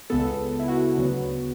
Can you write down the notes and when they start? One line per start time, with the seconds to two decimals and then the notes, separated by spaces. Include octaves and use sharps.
0.10 C#2 C#3 G#3 B3 A4
0.59 E4
0.68 F#4
0.97 D2 C#3 F#3 B3